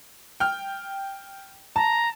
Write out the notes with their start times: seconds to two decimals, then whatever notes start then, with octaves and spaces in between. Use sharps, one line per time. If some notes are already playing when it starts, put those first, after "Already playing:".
0.40 G5 F6
1.76 A5 A#5